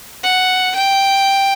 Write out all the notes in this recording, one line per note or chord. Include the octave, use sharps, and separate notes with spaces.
F#5
G5